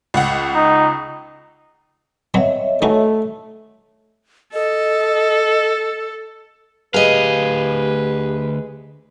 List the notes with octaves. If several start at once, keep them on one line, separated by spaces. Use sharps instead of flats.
C#2 F#5
D#4
B2 F#3 C4 C#5 D#5 E5
E3 A3 D#4 F#4
A4 D#5
D2 G4 G#4 B4 D#5 F5